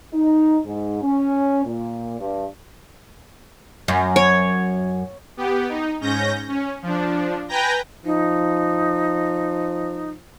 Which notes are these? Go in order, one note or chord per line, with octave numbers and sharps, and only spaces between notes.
D#4
G#2
C#4
A#2
G2
F#2
C#5
B3 G4
D#4
G#2 C#4 G6 A#6
C#4
F3 D4
B4 G5 G#5 A#5 G6 A#6
F3 D#4